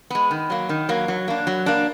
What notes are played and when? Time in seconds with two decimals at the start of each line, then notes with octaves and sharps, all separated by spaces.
0.10 G#3 B3
0.31 D#3
0.50 F#3 A#3
0.69 D#3
0.89 F#3 A#3
1.08 F#3
1.28 A#3 D4
1.47 F#3
1.66 A#3 D4